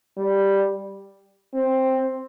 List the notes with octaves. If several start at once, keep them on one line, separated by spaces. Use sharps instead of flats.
G3
C4